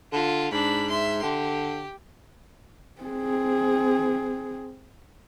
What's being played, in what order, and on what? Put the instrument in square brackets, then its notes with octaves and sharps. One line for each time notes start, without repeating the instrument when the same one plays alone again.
[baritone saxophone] D3 [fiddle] F4
[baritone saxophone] G#2 [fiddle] D4 B5
[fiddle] E5 C6
[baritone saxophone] D3 [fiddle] G4
[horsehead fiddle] C4 G#4